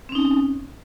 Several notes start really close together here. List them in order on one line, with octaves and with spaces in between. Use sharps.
C4 C#4 D#4